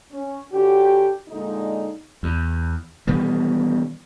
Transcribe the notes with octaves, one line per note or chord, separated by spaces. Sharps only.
C#4
D3 C#4 F#4 G4
A#2 D3 G#3 D#4
E2
B2 D#3 E3 G3